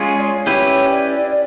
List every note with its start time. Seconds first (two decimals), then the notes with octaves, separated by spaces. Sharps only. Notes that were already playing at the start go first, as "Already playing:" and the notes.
Already playing: G#3 C#4 F4 G#4
0.18 D5
0.23 C#5
0.46 C#4 E4 G4 B4 C#5
0.89 D5
1.31 D5